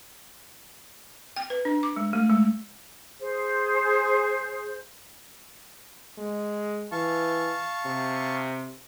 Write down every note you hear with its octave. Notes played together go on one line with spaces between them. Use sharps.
G5
B4
D4
D6
G#3
A3
G#3
G#4 C5
G#3
E3 F5 A5 C#6
C3